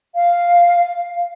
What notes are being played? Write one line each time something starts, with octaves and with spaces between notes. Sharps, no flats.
F5